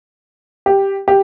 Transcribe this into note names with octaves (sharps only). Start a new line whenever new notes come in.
G4
G4